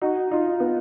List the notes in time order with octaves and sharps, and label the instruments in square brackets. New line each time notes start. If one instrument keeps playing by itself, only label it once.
[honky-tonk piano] D#4 [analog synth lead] F#4
[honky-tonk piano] D#4 [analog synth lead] F4
[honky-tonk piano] B3